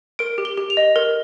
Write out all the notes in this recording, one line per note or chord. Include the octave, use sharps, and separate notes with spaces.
A#4 D7
G4
G7
G4
F7
D#5
A#4